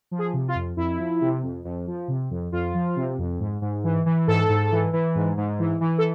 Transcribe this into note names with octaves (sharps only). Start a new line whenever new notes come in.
F3
G#4
C3
F4
F2
F2 E4
F3
C3
F2
F2
F3
C3
F2
F2 F4
F3
C3
F2
G#2
G#2
E3
E3
G#2 A4
G#2
E3
E3
G#2
G#2
E3
E3
A4